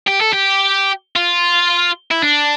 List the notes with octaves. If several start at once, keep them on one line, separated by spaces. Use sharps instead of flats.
G4
A4
G4
F4
E4
D4